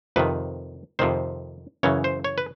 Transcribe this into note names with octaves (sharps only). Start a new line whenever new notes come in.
F2 C3 D#3 B4
F2 C3 D#3 C5
F#2 C#3 E3 C#5
C5
C#5
B4